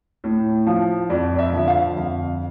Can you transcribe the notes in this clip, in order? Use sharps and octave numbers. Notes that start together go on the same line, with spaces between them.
A2
F3
F2 D5
D5
E5
D3 F3
F5
F2